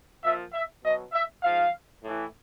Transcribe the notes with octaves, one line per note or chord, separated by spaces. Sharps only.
A#2 F3 E5
E5
B2 F#3 D#5
E5
G#2 F3 F5
A2 E3